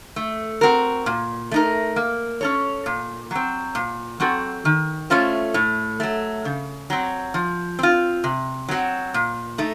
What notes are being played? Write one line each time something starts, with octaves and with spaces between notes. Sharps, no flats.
A3
C4 F#4 A#4
A#2
A3 D#4 A#4
A#3
C#4 A4 C#5
A#2
F#3 C4
A#2
F#3 C4 F#4 A4
D#3
A3 C#4 F4 C5
A2
F#3 A3
C#3
F#3 C4
F3
C4 F4
C3
F#3 C4 F#4
A#2
A3 D#4